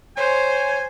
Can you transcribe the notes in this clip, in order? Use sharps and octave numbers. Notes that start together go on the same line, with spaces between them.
C5 C#5 G#5